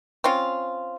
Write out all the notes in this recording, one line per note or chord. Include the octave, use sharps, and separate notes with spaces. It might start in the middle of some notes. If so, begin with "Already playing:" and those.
C4 C#4 F4